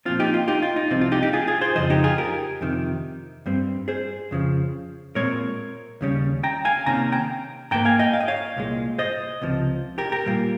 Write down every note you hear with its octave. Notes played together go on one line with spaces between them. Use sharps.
A#2 F3 C4 F4
D#4 G4
F4
D#4 G4
F4
D#4
C2 C3 F3 C4
F4
D#4 G4
D#4 G4
F4 G#4
F4 G#4
G#4 C5
F2 C#3 F3 C5 D#5
D#4 G4
F4 G#4
G4 A#4
F2 C3 D#3
G2 G3 C4
G#4 C5
F2 C#3 F3
A#2 G#3 C4 A#4 C#5
D#2 C#3 G3 C#4
G5 A#5
F5 G#5
C3 D#3 A#3 C#4 A#5
G5 A#5
G#2 D#3 A#3 G5 A#5
F5 G#5
D#5 G5
F5
D#5
C#5 F5
C2 A#2 G#3
C5 D#5
C#2 C3 F3
G4 A#4
G4 A#4
A#2 G3 A#3